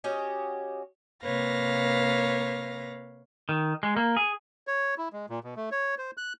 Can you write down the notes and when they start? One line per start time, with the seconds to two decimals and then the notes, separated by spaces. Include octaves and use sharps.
0.04 C#4 F#4 G4 D#5
1.23 C3 A#3 B4 C#5 F5 A#6
3.49 D#3
3.83 G#3
3.97 A#3
4.17 G#4
4.67 C#5
4.98 E4
5.13 G#3
5.30 A#2
5.44 B2
5.56 A3
5.72 C#5
5.98 C5
6.17 F#6